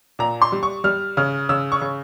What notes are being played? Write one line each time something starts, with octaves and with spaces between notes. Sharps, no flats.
A#2 A#5
C6
G3
C#6
G3 F6
C#3 F6
C#3 E6
C#6
C#3